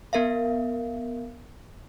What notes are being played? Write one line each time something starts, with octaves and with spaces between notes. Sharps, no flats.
B3 A#4 E5 F5